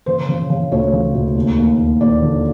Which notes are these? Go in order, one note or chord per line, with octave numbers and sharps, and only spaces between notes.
C#3 C5
C#3
C#3
D2 C#5
C#3
D2
D#2
D#2
D#2
D#2 D5
D3